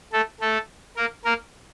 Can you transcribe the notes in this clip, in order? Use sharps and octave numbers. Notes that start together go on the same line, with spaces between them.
A3 A4
A3 A4
A#3 A#4
A#3 A#4